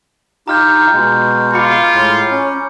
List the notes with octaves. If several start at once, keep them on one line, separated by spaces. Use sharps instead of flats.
D#4 F4 G4 A#5 F6 G6
B2 G#3
F4 B5 D6 C#7
A2 G#3
C#4